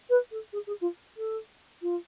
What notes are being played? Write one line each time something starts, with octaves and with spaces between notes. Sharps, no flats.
B4
A4
G#4
G#4
F4
A4
F4